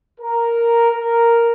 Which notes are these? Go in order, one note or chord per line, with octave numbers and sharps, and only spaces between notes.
A#4
A#4